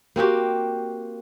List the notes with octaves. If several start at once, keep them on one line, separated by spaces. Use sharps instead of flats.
A#3 C4 F#4 G4